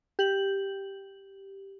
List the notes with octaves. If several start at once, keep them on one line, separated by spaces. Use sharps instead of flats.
G4 F#7